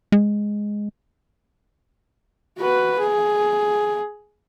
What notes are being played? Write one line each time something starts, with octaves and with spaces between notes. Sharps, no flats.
G#3
F#4 B4
G#4